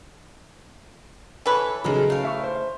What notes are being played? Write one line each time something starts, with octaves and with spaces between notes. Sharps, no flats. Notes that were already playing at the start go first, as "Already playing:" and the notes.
E3 A4 B4 C#5
C#3 F#3 G#3 D#4 A4 A#4
A2 F5
E5 C#6
C5